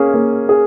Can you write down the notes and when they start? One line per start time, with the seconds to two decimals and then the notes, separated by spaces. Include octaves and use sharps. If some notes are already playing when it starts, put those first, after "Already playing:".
Already playing: A#3 C#4 G#4
0.14 A#3
0.49 G#4